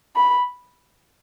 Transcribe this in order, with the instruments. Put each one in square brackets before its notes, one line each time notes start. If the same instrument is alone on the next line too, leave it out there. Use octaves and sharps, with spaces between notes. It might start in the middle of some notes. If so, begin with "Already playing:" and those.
[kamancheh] B5